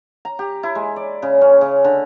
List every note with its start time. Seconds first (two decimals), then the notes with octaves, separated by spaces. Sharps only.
0.25 A#5
0.39 G4
0.63 E4
0.75 G#3
0.96 D5
1.22 C#3
1.41 C#4
1.61 C#3
1.84 D3